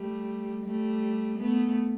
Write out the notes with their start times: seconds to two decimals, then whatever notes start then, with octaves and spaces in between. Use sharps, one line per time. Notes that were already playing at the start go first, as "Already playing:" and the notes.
Already playing: G3 A3
0.65 G3 A3
1.38 A3 B3